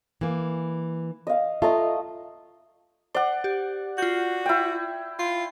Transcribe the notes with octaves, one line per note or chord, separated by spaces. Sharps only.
E3 A#3
D#5 F5
A3 F4 D#5 A#5
C5 D5 F#5
G4
F4 F#4 G6
E4 G5
F4 C6